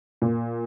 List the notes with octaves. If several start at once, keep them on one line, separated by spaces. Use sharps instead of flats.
A#2